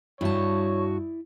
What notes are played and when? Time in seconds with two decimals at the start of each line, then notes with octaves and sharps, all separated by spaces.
0.21 G2 E4 F#4 C#5 D5 E5 A5